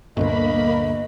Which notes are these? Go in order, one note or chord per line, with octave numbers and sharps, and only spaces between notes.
G1 D2 G2 A#2 A#3 D#5 B5